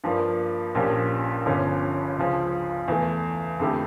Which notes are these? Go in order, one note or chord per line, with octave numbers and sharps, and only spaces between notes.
G2 F3 A#3 D4
A#1 A#2 F3 C#4 G4
G1 G2 D3 F3 C#4
C#2 C#3 F3
E2 E3 A3
F2 D3 A3 E4 G4